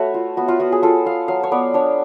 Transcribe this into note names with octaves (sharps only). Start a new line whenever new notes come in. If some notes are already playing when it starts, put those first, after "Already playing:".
Already playing: A3 F#4 B4 C#5
F4
B3 F#4
F4
B3 F#4
G#4
F4 A4
F4 F5
F#3 F5
C#5
B3 D5
D4 C#5